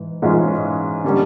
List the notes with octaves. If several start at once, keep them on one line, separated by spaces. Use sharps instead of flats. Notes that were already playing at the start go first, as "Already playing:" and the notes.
Already playing: G#2 E3
G#2 E3 G#3 C#4 F4
D3 G3 A#3 C#4